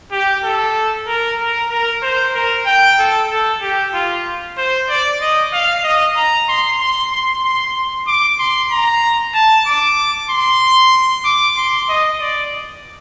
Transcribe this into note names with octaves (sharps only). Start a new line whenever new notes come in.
G4
A4
A#4
A#4
A#4
C5
A#4
G5
A4
A4
G4
F4
C5
D5
D#5
F5
D#5
A#5
C6
C6
C6
C6
C6
D6
C6
A#5
A5
D6
C6
D6
C6
D#5
D5